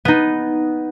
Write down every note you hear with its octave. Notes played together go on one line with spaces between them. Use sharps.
B3 D#4